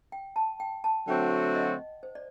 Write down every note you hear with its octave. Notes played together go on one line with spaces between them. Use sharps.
G5
A5
G5
A5
D3 F#3 A3 C4 F#4 G5
F#5
D#5
C5
D5